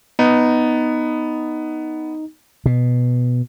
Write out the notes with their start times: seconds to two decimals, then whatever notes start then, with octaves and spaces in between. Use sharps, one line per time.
0.19 B3 D#4
2.66 B2